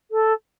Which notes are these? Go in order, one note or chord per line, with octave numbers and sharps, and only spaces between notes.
A4